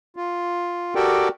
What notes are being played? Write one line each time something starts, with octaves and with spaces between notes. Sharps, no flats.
F4
F#4 G4 A4 A#4 D5 G5